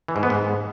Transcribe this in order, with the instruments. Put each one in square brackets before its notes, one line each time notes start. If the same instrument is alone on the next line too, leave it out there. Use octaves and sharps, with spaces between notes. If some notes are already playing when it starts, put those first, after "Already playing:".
[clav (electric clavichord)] E3
G#2
B3
G#2